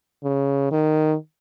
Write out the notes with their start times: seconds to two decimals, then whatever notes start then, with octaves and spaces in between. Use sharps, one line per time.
0.24 C#3
0.72 D#3